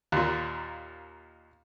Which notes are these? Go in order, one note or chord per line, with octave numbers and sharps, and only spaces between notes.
D#2 A#2